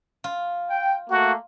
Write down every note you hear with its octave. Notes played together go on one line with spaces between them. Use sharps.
F4
G5
A3 A#3 F#4